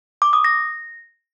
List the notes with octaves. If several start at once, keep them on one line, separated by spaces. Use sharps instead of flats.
D6
D#6
A#6